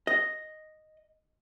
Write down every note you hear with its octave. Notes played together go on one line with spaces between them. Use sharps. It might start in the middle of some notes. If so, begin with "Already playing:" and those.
D#5